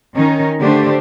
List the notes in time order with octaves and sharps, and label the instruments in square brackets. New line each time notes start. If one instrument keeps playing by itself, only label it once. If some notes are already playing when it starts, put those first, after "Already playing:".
[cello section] D#3 C#4 D#4 A#4
D3 A3 D4 G4 C5